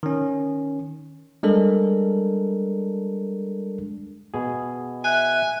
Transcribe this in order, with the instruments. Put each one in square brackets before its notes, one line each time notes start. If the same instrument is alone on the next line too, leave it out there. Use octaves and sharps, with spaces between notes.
[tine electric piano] D#3 C#4
G3 G#3 D4 A4 A#4
[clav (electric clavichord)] B2 G#4
[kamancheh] E5 [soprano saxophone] G#5 [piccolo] F#6